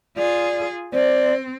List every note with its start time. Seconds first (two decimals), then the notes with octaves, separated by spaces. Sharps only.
0.17 F4 G#4 D5
0.93 C4 C5 D5